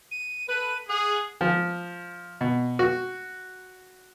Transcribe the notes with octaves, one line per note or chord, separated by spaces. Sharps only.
D#7
A4 B4 D#7
G#4 F#5
F3
B2
F#4